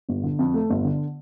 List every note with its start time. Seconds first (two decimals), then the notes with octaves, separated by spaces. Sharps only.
0.09 G1
0.23 D3
0.39 F2
0.54 A3
0.70 G1
0.85 D3